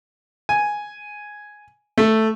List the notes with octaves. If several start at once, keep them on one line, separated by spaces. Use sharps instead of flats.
G#5
A3